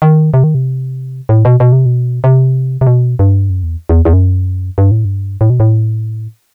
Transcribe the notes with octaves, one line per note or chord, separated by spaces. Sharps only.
D#3
C3
D#3
C3
A2
B2
B2
C3
B2
C3
C3
B2
G2
F#2
E2
E2
E2
F#2
G2
A2
G2
A2
B2
A2